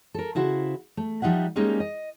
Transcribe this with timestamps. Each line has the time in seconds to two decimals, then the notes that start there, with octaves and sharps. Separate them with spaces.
0.14 A4 A#4
0.35 C#3 E4 F#4 C5
0.97 A3
1.22 F3 G3 D#4 E5 F#5
1.56 G3 G#3 A#3 C#4 D#4
1.80 D#5